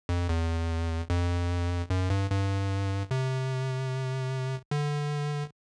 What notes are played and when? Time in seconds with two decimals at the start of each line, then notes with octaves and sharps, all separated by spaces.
0.09 F2
0.29 E2
1.10 F2
1.90 F#2
2.10 G2
2.30 G2
3.11 C3
4.71 D3